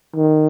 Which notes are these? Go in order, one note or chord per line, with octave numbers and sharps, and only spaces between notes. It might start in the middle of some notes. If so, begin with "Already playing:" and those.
D#3